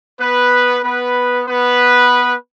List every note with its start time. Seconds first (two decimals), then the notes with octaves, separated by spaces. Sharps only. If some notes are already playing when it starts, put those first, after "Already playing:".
0.20 B3 B4
0.84 B3 B4
1.48 B3 B4